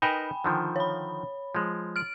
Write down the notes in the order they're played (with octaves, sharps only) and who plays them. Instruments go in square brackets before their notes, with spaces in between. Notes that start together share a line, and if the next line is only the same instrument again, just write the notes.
[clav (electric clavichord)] D#4 A#4 B4 [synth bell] G5 G#5 B5
[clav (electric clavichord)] D3 D#3 F3
[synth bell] C#5 B5
[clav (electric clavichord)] F3 G#3
[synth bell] F6 D7